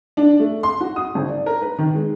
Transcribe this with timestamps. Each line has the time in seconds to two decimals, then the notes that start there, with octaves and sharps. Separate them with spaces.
0.17 D4
0.39 A3
0.63 C6
0.81 F#4
0.96 D#6
1.15 G#1
1.28 D5
1.46 A#4
1.62 B4
1.79 D#3
1.94 G#3